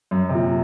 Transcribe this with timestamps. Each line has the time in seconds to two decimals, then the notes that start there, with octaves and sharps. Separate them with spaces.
0.11 F#2
0.29 C3
0.34 A#2